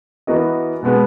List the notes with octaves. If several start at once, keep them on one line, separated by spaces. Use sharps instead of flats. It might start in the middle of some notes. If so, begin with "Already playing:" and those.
E3 B3 F#4 A#4 D#5
B2 G#3 B3